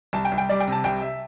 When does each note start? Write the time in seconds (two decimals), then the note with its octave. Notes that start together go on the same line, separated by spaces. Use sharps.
0.13 C2 A5
0.25 G5
0.32 C2
0.38 G5
0.49 G3 D5
0.60 G5
0.67 C3 A5
0.84 C2 G5
1.02 E5